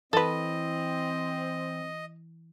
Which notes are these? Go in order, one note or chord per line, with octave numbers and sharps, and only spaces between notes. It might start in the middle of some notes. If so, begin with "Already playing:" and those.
E3 C4 A4 B4 D#5